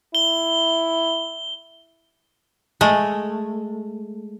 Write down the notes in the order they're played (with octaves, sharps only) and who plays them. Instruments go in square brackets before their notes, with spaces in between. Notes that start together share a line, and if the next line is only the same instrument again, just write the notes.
[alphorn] E4 [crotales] G7
[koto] G#3 A3